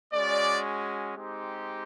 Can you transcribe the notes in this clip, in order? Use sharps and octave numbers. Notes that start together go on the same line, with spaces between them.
G#3 C#4 F#4 D5
G#3 C4 D#4 G4